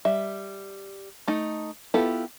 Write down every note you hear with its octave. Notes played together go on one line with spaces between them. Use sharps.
G3 E5
A3 D#4
B3 E4 F4 G4 A4